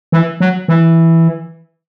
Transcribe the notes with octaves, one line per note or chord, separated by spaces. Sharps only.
E3
F#3
E3